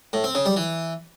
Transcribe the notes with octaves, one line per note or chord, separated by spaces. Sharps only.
A2
C4
C#3
G3
E3